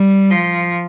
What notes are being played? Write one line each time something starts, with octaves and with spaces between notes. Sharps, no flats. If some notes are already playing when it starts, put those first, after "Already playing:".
Already playing: G3
F3